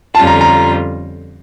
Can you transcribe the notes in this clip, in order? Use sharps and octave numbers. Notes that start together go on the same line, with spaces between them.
F2 D3 G3 C#4 F4 A5
A#5
A#5